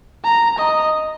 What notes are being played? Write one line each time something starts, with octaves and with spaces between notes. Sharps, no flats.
A#5
D#5